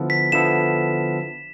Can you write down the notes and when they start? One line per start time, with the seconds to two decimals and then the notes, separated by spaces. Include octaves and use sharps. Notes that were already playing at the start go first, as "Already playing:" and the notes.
Already playing: D3 F3 B3 E4 A4
0.10 B6
0.32 D3 F3 B3 E4 A4 E7